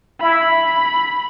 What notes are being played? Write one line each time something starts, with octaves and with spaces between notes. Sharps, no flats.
E4 B5